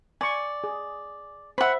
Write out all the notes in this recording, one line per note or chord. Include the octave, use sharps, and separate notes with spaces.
D5 G#5 C#6
G#4
C5 E5 F#5 B5